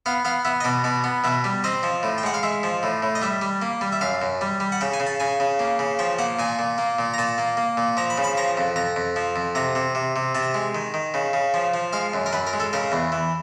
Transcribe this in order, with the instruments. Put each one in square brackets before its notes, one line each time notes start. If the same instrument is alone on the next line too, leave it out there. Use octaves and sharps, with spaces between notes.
[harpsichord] B3 F5
B3 F5
B3 E5
D#5
B2 D5
B2 D5
B3
B2 E5
G3
C4 D#5
F3
A2
G5
G#3 F#5
F5
G#3 E5
F3
A2
A2
D#5
G3 E5
G3
A#3
G3
E5
F#2 F5
F#2
G3
G3
F#5
C#3 G5
G#5
C#3
A5
C#3 G#5
C#3
A#3
C#3
F3 G5
A#3 F#5
A#2 G#5
A#2
A#3
A#2
A#5
A#2 A5
A#3
A#3
A#2
F3 A#5
B5
C#3
B5
F3 A#5
F2
F2 A#5
F2
F3
F2
C3 A#5
C3
C3
C3
C3 A5
G#3
D#3
D#3
C#3
C#3
F3
F3
G#3 F5
F#2
A#4
F#2 B4
A#4
G#3
A4
C#3 A#4
E2
E3